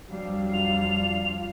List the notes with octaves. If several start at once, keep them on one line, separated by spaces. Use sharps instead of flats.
F2 F#3 G3 D4 F5
F4 F7